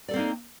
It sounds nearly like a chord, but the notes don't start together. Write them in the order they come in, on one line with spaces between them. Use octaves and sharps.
D5 A4 C4 A#3 D#4